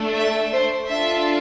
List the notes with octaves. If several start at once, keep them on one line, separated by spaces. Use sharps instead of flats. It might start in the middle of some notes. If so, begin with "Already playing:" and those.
Already playing: A3 D4 A4
E5
C5
D4 F4 A4 E5